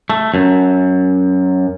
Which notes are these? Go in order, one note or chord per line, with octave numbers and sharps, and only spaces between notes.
A3
F#2